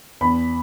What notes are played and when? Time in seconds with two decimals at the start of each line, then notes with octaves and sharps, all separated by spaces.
0.21 E2 B5